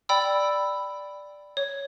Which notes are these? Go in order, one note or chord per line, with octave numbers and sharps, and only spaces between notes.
D5 G5 B5 E6
C#5